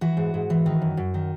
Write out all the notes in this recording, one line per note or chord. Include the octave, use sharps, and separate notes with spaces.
E3 F#4
G#2
G#2
E3
D#3
F#2
F#2
D#3